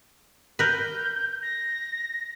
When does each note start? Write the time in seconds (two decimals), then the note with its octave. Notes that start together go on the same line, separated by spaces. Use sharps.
0.59 A#4 B4 G6
1.42 A#6